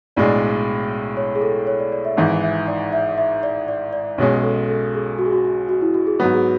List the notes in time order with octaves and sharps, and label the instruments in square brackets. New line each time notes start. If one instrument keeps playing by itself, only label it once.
[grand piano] B1 A2 G#3 D4 [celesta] D5
[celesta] C#5
G#4
A4
C#5
D5
D5
E5
[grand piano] G#1 G#2 E3 [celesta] E5
[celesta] E5
D5
E5
E5
D5
D5
D5
[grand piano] B1 B2 G#3 C#4 [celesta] C#5
[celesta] G#4
A4
A4
G#4
F#4
G#4
F#4
F#4
F#4
E4
F#4
G#4
[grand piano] G#2 F#3 B3 [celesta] F#4
[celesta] G#4